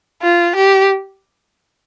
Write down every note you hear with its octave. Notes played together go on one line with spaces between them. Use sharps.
F4
G4